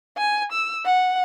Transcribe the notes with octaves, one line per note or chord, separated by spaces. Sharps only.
G#5
E6
F#5